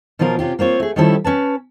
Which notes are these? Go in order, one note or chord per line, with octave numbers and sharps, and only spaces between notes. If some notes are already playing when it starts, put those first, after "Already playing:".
B2 F3 F#3 F4 A#4
C3 C#4 F4 G4
A#3 C4 F4 C#5
A3 G#4
D#3 F3 G3 C#4 E4 A4
C#4 B4 A5